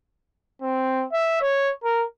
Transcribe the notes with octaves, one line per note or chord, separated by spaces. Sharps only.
C4
E5
C#5
A#4